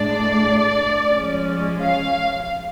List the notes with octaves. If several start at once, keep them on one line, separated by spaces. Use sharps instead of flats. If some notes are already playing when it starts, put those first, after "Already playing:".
Already playing: A2 G#3 D4 D5
F3 G#3 C#4
F5